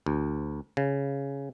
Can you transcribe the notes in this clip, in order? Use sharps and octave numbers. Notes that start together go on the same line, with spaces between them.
D2
C#3